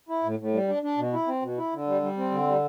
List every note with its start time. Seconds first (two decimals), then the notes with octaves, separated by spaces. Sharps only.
0.09 E4
0.23 A2
0.39 A2
0.53 G3
0.68 D4
0.83 D4
0.98 B2
1.13 E4
1.27 C4
1.42 B2
1.58 E4
1.73 D3
1.87 G3
2.02 G3
2.17 C4
2.31 D3
2.46 G3